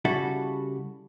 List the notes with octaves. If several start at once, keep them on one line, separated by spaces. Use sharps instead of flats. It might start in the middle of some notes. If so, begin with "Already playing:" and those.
C#3 G3 E4 F#4 A4